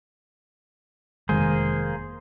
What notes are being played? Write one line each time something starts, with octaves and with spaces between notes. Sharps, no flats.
F1 D#3 G#3 A#3 G#4 C5